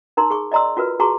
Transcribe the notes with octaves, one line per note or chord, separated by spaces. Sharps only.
D#4 A#4 A#5 C6
G#4 C#6
D5 D#5 A#5 C6 E6
F4 F#4 A#4 B4
F#4 G#4 A5 A#5 C6 C#6